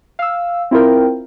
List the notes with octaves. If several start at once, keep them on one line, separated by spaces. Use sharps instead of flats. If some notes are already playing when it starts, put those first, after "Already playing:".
F5 E6
C4 E4 F4 A#4 G5